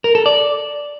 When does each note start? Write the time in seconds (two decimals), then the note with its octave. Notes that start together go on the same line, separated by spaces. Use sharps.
0.04 A#4
0.15 A4
0.26 D5